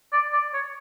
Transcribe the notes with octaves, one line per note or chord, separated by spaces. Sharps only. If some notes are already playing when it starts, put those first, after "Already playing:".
D5
D5
C#5